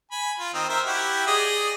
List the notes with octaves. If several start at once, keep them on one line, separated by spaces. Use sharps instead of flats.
G#5 B5
F4
D#3 C4 D#4
A#4 C5 E5
E4 F#4 G4
G#4 D5 D#5